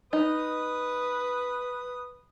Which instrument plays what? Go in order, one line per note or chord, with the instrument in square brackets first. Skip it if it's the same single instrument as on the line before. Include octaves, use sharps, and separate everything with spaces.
[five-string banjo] D#4 [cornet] B4 [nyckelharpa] D#6